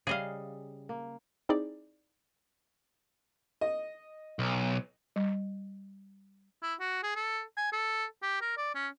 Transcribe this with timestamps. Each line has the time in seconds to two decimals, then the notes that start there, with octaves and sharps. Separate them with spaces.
0.07 C#3 G3 G#4 D#5 F5
0.89 A#3
1.49 C4 D#4 E4 G#4 D5
3.61 D#5
4.39 B1
5.16 G3
6.63 E4
6.80 F#4
7.03 G#4
7.16 A4
7.57 G#5
7.72 A4
8.22 G4
8.42 A#4
8.58 D5
8.75 C#4